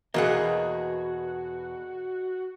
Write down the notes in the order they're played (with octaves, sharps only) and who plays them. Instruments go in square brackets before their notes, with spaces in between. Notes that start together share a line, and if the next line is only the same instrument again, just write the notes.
[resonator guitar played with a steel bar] E2 B2 F#5 [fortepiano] A#3 G#4 [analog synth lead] F#4 [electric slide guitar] B4 D#5